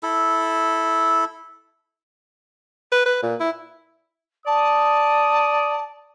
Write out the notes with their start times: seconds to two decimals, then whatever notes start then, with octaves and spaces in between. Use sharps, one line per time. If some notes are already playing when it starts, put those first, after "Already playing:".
0.03 E4 A4
2.92 B4
3.06 B4
3.23 A#2
3.40 E4
4.47 D5 A5 D#6